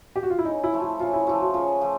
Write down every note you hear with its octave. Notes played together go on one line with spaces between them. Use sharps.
G4
F#4
F4
E4
C#3 D#4
E4
F3 A3
E4
C#3 F4
E4
F3 A3 E4
F#4
C#3 F4
F3 A3